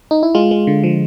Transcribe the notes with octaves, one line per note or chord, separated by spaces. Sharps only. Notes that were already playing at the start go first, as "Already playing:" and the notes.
D#4
E4
G#3 F4
G#3
D3
F3